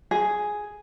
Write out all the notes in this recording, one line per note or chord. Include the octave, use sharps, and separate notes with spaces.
G#4